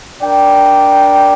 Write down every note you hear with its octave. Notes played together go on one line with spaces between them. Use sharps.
D4 A#4 D5 G5